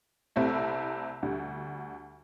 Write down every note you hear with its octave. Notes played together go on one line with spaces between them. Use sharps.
C2 C3 A3 C4 E4
D2 D3 G3